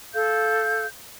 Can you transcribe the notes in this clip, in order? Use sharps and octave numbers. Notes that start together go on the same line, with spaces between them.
A4 F5 G6